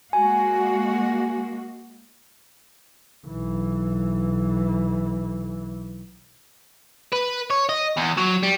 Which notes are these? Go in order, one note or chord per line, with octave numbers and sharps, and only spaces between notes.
G#3 A#3 F#4 G#5
B1 E3
B4
C#5
D#5
E2
F#3
G3